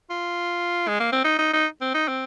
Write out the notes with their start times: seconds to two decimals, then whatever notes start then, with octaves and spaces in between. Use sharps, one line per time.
0.10 F4
0.88 G#3
1.00 A#3
1.12 C4
1.24 D#4
1.39 D#4
1.53 D#4
1.81 C4
1.94 D#4
2.08 C4